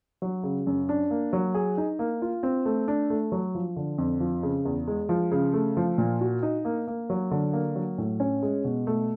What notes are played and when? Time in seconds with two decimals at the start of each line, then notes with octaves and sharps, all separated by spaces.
0.22 F#3
0.43 C#3
0.67 F#2
0.89 D4
1.11 A#3
1.33 F#3
1.54 G#4
1.78 D#4
1.99 A#3
2.22 F4
2.43 C4
2.66 A3
2.88 D4
3.10 A3
3.32 F#3
3.55 F3
3.76 D3
3.98 F2
4.20 F3
4.43 C#3
4.65 E2
4.87 G#3
5.09 F3
5.32 C#3
5.54 A3
5.77 F3
5.98 A#2
6.21 F#4
6.43 D#4
6.65 A#3
6.88 A#3
7.10 F#3
7.31 D3
7.53 A#3
7.76 F#3
7.98 A2
8.20 C#4
8.42 G#3
8.64 B2
8.87 A3